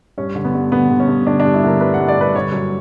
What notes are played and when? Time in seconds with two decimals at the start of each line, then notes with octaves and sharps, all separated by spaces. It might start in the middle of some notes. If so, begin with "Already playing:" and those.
0.18 G2 C#4
0.35 D3
0.44 B3
0.54 G2
0.72 D3 B3
0.90 D3
1.00 C#4
1.08 G2
1.26 D3 D4
1.40 D4
1.45 G2
1.54 E4
1.63 D3 A#4
1.81 G2 B4
1.94 F#5
1.99 G2
2.08 D5
2.17 G2 B4
2.34 D3 C#5
2.53 F#2